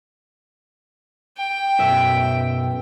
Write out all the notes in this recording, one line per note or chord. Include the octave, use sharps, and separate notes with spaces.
G5
B1 F#2 E5